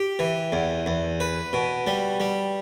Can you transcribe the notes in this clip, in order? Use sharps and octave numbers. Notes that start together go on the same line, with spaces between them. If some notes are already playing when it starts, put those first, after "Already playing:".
Already playing: G4
E3
E2
E2
B4
B2
G3
G3